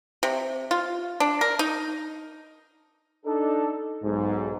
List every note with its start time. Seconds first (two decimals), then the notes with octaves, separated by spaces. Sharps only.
0.23 C3
0.71 F4
1.20 D4
1.41 A#4
1.59 D#4
3.25 D4 D#4 A4
4.03 B1 G#2